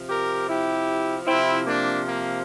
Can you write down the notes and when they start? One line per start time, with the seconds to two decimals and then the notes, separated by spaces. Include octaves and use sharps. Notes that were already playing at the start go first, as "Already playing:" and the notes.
Already playing: C3 F3
0.09 G4 A#4
0.48 E4 G4
1.26 C3 F3 C4 E4
1.66 A#3 D4
2.06 A#3